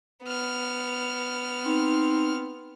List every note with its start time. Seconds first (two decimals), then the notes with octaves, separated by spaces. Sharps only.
0.24 B3 F6
1.65 C4 D#4